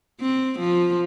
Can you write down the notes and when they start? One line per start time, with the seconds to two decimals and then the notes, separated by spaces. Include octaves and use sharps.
0.20 C4
0.60 F3